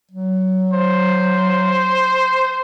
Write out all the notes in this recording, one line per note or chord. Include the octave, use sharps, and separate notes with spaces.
F#3
C5